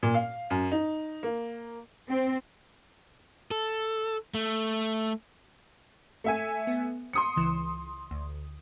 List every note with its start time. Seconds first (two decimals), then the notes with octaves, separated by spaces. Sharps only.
0.03 A#2
0.14 F5
0.50 F#2
0.72 D#4
1.23 A#3
2.09 C4
3.51 A4
4.34 A3
6.24 A3 E5 G#5
6.67 B3
7.13 C6 D#6 C#7
7.36 C#2 E3 E7
8.11 D2